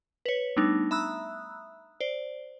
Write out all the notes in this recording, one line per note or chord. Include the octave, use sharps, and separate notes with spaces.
B4 C#5
G3 A3 B3 D4 D#4
E5 A#5 B5 D#6 E6 F#6
C5 D5